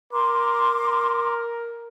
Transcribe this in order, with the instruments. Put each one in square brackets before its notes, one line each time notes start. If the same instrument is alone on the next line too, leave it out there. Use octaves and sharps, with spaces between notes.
[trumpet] A#4 [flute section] C6 D6